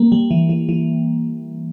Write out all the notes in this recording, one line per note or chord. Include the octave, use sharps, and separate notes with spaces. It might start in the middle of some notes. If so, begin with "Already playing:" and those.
Already playing: G3 A#3
G3
E3
E3
E3